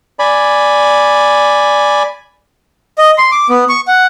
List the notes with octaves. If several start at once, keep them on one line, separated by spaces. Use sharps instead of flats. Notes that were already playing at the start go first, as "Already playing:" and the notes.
D5 G#5 B5
D#5
C6
D6
B3
C#6
F#5